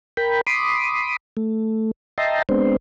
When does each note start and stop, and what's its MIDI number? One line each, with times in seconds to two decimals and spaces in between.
0.17 0.41 70
0.17 0.41 79
0.17 0.41 83
0.47 1.17 83
0.47 1.17 84
0.47 1.17 86
0.47 1.17 87
1.37 1.91 57
2.18 2.42 75
2.18 2.42 76
2.18 2.42 79
2.18 2.42 81
2.18 2.42 82
2.18 2.42 84
2.49 2.76 56
2.49 2.76 59
2.49 2.76 60
2.49 2.76 62
2.49 2.76 72